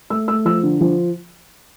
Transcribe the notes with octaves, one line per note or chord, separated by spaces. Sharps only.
A3 E6
A3 E6
F3 E6
D3
F3